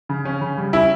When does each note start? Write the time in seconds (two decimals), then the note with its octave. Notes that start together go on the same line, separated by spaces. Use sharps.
0.09 C#3
0.25 C#4
0.41 C#3
0.57 G3
0.73 C#4 E4